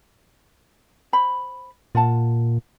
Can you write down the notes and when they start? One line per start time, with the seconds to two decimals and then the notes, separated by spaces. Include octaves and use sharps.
1.13 C5 B5
1.95 A#2 F4 F#5 A5